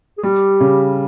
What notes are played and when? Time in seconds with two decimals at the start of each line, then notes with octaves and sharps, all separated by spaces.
0.18 G#4
0.23 G3 G4
0.60 C#3